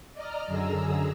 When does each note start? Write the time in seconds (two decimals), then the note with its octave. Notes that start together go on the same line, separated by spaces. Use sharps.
0.14 D5 D#5 A#5 F6
0.47 F#2 D3 G#4 A#5 E6